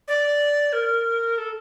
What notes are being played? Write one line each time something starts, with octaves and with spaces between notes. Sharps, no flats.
D5
A#4
A4